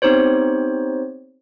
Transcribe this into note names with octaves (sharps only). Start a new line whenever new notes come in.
B3 C4 D#4 G4 C5 C#5